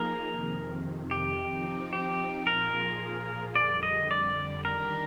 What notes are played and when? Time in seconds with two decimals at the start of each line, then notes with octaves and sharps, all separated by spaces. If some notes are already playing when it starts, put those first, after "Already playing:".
Already playing: F3 A#3 D#4 G#4 A#4
0.30 F2 C3 D#3
1.11 G4
1.39 F3 C4 D#4
1.93 G4
2.47 A#2 F3 A#3 F4 G#4 A#4
3.56 F2 D3 G3 D5
3.83 D#5
4.11 D5
4.64 D#3 G3 D4 G4 A#4